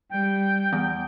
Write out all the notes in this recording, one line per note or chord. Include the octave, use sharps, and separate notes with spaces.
G3 G5
E2